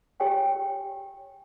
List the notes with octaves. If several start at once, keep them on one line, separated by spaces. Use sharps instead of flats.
G4 C#5 G5 G#5